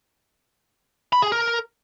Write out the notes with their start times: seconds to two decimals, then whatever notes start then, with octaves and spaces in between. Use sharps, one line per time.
1.13 B5
1.22 G#4
1.32 A#4